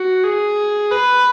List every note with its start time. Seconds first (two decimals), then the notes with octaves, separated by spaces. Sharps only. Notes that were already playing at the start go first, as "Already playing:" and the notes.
Already playing: F#4
0.24 G#4
0.91 B4